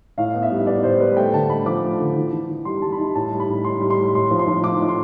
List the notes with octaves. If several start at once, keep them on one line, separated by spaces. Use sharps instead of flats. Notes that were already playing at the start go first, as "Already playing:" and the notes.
A2 F5
B3
E5
G3
B3 D5
A2 C5
G3 B4
A3 G5
D3 A5
A3 B5
F3 D6
A3
D3
E3
E3
E3
G3 C6
G3 A5
B5
E4 A5
A2 A5
G3
B5
A2
A2 C6
G3
C6
A2
A2 C6
F3
C6
F3
A2 D6
A2
C6